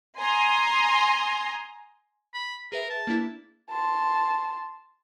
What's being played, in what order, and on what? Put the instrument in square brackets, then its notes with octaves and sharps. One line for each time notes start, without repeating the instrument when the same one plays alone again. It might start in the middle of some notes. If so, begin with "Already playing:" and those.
[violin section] G#5 A#5 C6 D#6
[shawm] B5
[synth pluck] G#4 B4 E5 [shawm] A#4
[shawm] A5
[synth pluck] A#3 D4 E4
[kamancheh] A5 C6